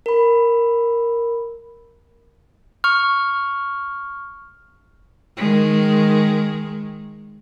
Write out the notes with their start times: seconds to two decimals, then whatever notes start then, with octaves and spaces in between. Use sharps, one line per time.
0.06 A#4 B5
2.84 C#6 F6
5.37 D#3 G#3